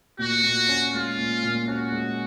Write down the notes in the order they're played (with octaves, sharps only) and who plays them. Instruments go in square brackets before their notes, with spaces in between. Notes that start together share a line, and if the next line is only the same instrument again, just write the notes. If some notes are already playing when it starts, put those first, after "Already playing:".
[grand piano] A#2 [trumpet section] F#4
[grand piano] A#2
C#4
[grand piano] G#3 [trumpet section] F4
[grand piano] A#2
A#2
[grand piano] C#4 [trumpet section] F#4
[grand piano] G#3